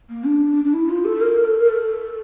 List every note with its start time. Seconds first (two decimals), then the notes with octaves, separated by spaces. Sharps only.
0.09 A#3
0.25 D4
0.64 D4
0.73 E4
0.89 F4
1.04 A4
1.21 A#4
1.44 A4
1.58 A#4
1.68 A4